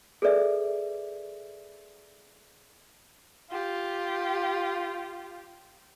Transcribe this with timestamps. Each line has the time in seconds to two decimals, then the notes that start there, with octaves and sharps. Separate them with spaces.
0.22 G#4 A4 B4 D5 E5
3.50 F4 G4